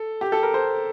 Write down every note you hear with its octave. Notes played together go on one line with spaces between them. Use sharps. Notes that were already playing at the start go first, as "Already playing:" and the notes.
Already playing: A4
G4
A4
A#4
C5